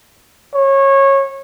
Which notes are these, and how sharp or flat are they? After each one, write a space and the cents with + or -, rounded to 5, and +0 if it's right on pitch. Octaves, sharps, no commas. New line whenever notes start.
C#5 -20